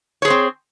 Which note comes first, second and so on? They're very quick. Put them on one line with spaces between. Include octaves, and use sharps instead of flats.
C#5 G#4 C5 C4